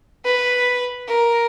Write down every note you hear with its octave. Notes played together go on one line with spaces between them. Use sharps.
B4
A#4